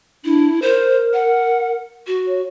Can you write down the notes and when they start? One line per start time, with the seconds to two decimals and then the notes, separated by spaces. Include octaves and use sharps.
0.24 D4 E4
0.62 A#4 C5
1.13 F#5
2.07 F#4
2.27 C#5